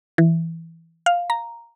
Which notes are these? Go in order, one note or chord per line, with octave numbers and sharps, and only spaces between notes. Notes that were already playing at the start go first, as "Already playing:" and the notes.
E3
F5
A#5